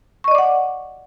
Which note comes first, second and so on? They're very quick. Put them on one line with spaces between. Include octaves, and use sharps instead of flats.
C#6 D#5 D5 D6 F#5